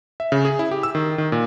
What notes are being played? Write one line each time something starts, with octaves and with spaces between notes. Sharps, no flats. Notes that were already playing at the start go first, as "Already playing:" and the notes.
E5
C#3
G#4
E4
G4
E6
D#3
D#3
A#2